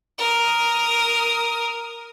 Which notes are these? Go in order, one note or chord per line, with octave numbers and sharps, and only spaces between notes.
A#4 D#6